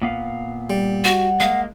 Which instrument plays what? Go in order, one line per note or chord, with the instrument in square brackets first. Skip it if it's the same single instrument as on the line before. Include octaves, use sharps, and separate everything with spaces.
[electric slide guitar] A#2 B3 F5
[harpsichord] G3
[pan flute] F#4 [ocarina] F#5
[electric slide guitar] G#3 A#3 [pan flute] F5